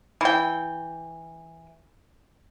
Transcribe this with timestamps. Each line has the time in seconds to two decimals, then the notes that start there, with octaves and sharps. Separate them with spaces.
0.21 E3 G5